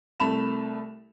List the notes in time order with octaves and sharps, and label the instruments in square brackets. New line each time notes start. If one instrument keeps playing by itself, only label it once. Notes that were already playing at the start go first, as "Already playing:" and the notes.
[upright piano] C2 A3 A5 B5 E7 F7